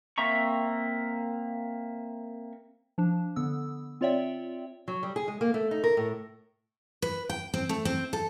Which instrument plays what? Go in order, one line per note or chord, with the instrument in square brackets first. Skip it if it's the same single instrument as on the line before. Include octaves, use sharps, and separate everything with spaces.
[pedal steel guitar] A#3 C4 E5 A#5 C#6
[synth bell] F3 D4
D3 B3 E6
C4 F4 C#5 D5 E5 G5
[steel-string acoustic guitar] F#3
G3
G#4
G#3
A#3
A3
D#4
A#4
A2
B4
G5
C4
A3
C4
A4